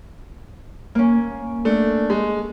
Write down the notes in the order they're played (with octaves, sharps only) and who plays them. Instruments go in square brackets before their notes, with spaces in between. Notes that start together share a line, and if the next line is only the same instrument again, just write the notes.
[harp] A#3 C#4
[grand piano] A3 D4
G#3